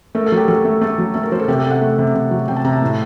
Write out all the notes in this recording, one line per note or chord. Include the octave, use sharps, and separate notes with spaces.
A3 A#4
A4
F#3
G4
F#3 A4
A3
A3 A4
F#3
A3 A4
A#4
F#3 C5
A4
C3 G4
A4
C3
F#5
A3
C3
C3
F#3
C3 G5
A5
C3 A#5
A5
A2